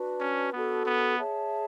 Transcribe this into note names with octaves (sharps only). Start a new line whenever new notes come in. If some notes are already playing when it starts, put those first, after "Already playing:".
Already playing: D4 F#4 B4
C#4
B3 D4 F#4 A4
B3
G#4 C#5 E5 A5